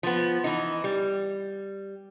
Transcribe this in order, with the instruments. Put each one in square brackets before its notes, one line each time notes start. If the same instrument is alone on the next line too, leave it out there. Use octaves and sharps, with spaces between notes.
[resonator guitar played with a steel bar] F3 B3
E3 D#4
G3